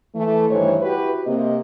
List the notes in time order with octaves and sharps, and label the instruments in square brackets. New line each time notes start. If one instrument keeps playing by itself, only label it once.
[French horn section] E3 A3
G2 D#3 E3 C5 C#5
E4 F#4 G4 B4
C3 A#3 D#5